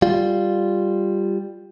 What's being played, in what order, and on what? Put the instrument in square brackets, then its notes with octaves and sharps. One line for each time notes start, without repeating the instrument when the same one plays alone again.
[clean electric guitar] G3 F4